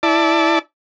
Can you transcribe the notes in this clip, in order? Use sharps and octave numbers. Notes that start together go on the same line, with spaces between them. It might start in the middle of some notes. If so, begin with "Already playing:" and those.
E4 D5 A5